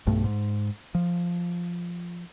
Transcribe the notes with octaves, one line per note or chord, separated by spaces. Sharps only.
B1 G2 A3
G#2
F3